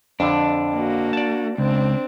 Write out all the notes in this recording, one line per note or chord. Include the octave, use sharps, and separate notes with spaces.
F2 D3 D4
A#3 F#4
D5 A5
C#2 C4 D4